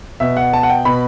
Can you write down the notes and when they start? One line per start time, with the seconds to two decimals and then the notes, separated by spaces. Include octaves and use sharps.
0.20 B2 E5
0.37 F#5
0.53 A5
0.63 F#5
0.69 G5
0.85 B2 B5